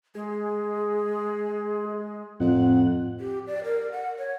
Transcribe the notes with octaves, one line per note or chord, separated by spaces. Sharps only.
G#3 G#4
F2 A2 F#5
G4
D5
A#4
F#5
C#5